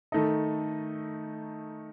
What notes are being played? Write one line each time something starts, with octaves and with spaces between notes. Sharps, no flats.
D#3 A3 D#4 A4 D#5